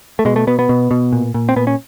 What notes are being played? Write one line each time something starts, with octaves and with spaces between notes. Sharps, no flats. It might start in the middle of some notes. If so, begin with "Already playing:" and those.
A3
B2 G#3
A3
B2 B3
B3
B2
B2
A#2
A#2
C4
A#2 B3
C#4